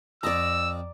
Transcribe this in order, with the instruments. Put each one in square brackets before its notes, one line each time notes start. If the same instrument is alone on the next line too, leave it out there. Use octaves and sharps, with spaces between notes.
[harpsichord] F2 C4 D#5 [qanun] D5 A#5 [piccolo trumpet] E6